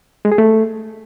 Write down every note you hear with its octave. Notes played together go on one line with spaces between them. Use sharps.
G#3
G#4
A3